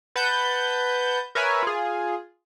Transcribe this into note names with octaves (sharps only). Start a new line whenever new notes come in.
B4 F#5 A5 G6
A#4 B4 C#5 E5 G#5
F4 G#4